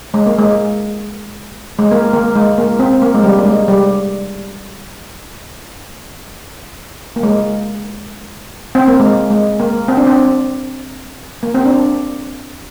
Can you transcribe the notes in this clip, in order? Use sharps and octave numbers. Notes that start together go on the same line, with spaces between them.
G#3
A#3
G#3
G#3
A#3
A#3
G#3
A#3
C4
A#3
G#3
G3
A#3
G#3
G3
A#3
G#3
C4
A#3
G#3
G#3
A#3
C4
D4
C4
A#3
C4
D4